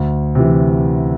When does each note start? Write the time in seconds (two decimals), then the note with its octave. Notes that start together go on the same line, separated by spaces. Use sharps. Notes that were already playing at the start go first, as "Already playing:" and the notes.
Already playing: D2
0.35 C3 E3